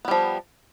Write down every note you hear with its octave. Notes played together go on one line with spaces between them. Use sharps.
F3 G3 B3